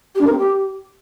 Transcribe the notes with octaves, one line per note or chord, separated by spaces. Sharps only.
G4
D4
A#4
C4
G4